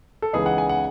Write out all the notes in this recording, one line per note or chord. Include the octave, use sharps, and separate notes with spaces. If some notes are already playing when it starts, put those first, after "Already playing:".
A4
C#2 C#3 E3 B3 D#4 G#4
F#5
G#5
F#5